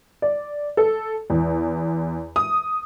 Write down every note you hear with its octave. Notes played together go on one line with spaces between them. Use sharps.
D5
A4
E2
D#6